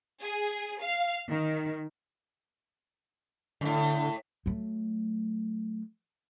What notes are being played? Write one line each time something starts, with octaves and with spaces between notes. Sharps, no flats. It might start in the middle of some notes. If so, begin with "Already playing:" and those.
G#4
F5
D#3
F#2 A2 D3
F#3 A3